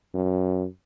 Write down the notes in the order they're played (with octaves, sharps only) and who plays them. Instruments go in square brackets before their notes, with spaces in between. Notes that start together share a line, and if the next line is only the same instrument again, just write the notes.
[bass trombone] F#2